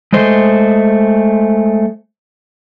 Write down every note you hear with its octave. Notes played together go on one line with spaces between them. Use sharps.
G#3 A3 C5 D#5